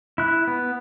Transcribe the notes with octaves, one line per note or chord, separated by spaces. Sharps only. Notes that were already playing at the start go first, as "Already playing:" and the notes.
E4 F#6
B3